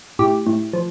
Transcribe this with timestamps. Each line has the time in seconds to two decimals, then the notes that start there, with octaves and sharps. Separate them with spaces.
0.19 A2 G4
0.46 A2
0.73 F3